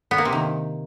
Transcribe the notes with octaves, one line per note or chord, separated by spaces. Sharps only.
B3
A#3
C3
D#3